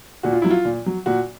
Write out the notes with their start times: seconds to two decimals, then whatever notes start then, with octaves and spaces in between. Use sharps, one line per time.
0.23 A#2 F#4
0.33 F4
0.42 F#3 E4
0.50 F4
0.65 A#2
0.86 F#3
1.06 A#2 F#4